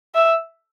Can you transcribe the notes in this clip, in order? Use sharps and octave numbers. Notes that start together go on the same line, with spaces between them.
E5